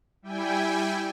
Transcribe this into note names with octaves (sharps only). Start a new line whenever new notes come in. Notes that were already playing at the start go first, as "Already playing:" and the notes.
G3 E4 G5 G#5